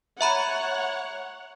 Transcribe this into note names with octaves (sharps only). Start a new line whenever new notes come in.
C#5 E5 F#5 A#5 B5